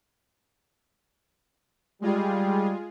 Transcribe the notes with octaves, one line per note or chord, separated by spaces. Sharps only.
G3 G#3 F4 G#4